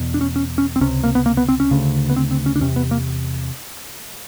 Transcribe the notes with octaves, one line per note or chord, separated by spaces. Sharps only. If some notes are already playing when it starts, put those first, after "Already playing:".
Already playing: E2 B2
D4
C#4
C#4
C#4
C4
C#2 C3 C#4
A#3
B3
A#3
B3
C4
C#4
D2 C#3
B3
C4
C4
C#4
D4
E2 C3 C#4
B3
A#3